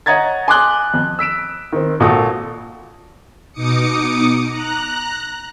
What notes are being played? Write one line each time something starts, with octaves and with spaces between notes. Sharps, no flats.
C#5 D#5 F#5 A#5 G#6 A6
G#5 C6 D6 D#6 F#6 G7
F2
E6 B6 D7 E7
D#3 C4
G#1 A#2 F#4 A4 D#6
B2 D#4 D6 D#6 C#7
A#5 F#6